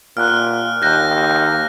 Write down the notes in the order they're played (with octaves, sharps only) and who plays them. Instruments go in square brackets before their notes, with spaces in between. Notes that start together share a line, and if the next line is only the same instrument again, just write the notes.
[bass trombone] A#2 [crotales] F6 F#6
[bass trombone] D#2 [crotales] F#6 G6 A#6